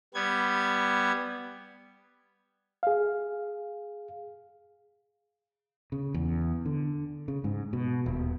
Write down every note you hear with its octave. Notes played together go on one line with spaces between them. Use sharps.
G3 B3 G#6
G#4 F5
C#3
E2
D3
C#3
G#2
B2
D#1